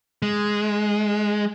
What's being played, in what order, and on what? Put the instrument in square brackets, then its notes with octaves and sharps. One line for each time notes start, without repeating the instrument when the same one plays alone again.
[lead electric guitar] G#3